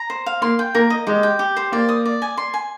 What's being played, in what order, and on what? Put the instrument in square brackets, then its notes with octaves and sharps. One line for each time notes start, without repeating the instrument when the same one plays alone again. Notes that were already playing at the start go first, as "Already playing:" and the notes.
Already playing: [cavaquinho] A#5
C5
F5
[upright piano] A#3 [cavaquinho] C6
[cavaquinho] G5
[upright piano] A#3 [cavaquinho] A#4
[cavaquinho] D#5
[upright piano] G#3 [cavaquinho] G4
[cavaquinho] G5
G4
C5
[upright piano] A#3 [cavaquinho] D5
[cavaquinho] D#6
D5
G#5
C6
G#5